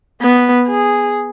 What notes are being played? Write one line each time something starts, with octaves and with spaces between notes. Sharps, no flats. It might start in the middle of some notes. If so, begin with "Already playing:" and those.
B3
G#4